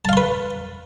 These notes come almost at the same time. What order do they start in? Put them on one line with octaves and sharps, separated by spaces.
A5 F5 C6 B4